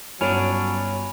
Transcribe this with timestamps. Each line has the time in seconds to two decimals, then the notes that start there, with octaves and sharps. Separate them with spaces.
0.21 G1 F#3 C#4 D4 C#5 G#5 B5 F7